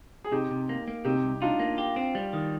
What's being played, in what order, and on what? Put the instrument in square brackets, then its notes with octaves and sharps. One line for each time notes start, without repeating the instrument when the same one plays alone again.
[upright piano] G#4
[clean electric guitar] C3 [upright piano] D#4 G4
[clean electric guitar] C3
A#3
A#3
[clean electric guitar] C3 [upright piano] D#4 G4
[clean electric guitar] C2
[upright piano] D4 F4 [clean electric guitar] D#4
[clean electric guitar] A#3
G4
C4
G3
D#3